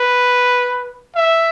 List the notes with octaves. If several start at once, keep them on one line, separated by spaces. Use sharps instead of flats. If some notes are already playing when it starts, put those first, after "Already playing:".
Already playing: B4
E5